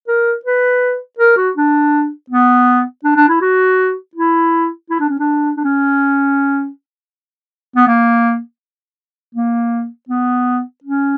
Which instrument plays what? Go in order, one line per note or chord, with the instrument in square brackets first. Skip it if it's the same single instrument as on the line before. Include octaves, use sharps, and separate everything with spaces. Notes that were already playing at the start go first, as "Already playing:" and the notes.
[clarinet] A#4
B4
A#4
F#4
D4
B3
D4
D4
E4
F#4
E4
E4
D4
C#4
D4
D4
C#4
B3
A#3
A#3
B3
C#4